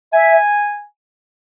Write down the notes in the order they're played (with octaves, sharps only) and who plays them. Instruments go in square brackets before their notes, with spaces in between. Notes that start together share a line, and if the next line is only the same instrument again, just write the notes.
[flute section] E5 [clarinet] G#5